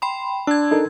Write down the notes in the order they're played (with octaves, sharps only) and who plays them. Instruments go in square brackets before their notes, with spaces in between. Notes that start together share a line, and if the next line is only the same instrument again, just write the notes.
[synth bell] G5 B5 C6
[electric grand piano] D4 [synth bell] E6 G#6
[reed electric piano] D#4 A4 A#4